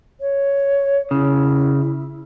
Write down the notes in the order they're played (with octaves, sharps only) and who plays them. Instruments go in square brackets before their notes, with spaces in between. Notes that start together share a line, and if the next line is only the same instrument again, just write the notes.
[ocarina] C#5
[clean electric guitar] C#3 [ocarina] E4